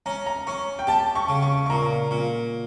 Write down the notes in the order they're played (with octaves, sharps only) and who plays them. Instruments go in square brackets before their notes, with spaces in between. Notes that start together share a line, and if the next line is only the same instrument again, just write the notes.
[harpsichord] C#4 [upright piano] A#5
[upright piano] A#5
[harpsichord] C#4 [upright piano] C#6
[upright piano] G5
[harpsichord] G4 [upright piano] A5
[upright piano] C#6
[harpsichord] C#3
[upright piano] C#6
C#6
[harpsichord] A#2 [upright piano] A#5
[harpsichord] A#2